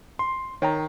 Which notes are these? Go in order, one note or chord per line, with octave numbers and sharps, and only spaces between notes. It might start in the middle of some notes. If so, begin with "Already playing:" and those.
C6
D#3 C#5 G5 A#5